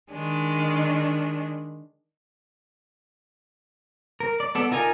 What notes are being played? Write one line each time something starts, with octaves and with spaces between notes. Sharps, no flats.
D#3 G#3 D4
A#4
D5
B3 A4 D5
D#4 F4 A#4 G#5 A#5